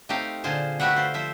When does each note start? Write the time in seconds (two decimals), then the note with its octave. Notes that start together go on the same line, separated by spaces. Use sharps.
0.09 A3 C4 D#4 G4 F5
0.44 A#2 D3 F4 G#4 C5 A5
0.80 A3 F#4 G4 B4 E5 F#5
0.96 F4 C5
1.14 F3 C5 E5